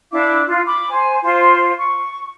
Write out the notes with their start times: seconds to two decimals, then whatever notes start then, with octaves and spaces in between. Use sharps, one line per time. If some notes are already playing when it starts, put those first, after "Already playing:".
0.12 D4 E4 F5 D6
0.47 F4
0.66 B5 D6
0.90 C5 G#5
1.22 F4 C5
1.79 C#6